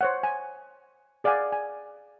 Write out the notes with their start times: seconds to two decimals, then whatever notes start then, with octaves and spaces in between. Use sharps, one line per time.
0.01 C5 C#5 F#5
0.23 G#5
1.24 G#4 D5 F5 F#5 G#5
1.52 G#5